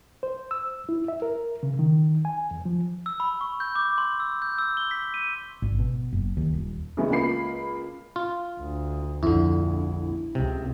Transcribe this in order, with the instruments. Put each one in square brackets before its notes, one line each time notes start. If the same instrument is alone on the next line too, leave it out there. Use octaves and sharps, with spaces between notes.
[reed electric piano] C5
E6
E4
E5
A#4
C#3
D#3
G#5
E2
F3
[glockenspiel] E6
B5
C#6
G6
D6
C6
E6
G6
E6
G7
B6
D#7
[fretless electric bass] G#1
B2
F#1
D#2
D#1
[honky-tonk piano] C#3 E3 G#3 A3 B3
C#2 A#3 F4 B5 C7
[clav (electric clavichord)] F4
[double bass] D2
[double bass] A#1 [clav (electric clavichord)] F2 D3 [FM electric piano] E4
[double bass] C#2 [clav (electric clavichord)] C3